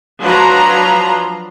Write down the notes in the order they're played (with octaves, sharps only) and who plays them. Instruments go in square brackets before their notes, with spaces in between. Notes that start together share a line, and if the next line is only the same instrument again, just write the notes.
[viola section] F3 F#3 D4 B4 A#5 C6